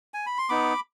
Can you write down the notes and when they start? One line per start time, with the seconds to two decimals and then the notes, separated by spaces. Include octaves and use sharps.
0.14 G#5
0.26 B5
0.38 C6
0.49 B3 D#4 B5 D6